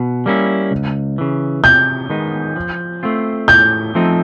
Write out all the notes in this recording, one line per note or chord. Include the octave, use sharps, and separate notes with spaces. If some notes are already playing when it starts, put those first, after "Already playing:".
Already playing: B2
G3 A#3 C#4 E4
C#2
C#3 E3
C3 G6
D#3 G#3 B3 D#4
F3
A3 C4 F4
A2 G6
F3 A3 C4 D#4